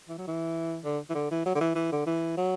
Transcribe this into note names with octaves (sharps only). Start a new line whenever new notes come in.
E3
F#3
E3
D3
E3
D3
E3
F#3
D3
E3
E3
D3
E3
F#3